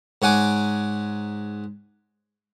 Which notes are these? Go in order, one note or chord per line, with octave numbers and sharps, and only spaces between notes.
G#2 C#5 F#5 G#5 D6